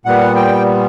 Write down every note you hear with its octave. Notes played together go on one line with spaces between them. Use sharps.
A#2 G3 B3 F#5
G5